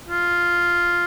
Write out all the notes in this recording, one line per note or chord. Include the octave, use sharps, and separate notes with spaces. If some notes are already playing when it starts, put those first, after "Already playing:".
F4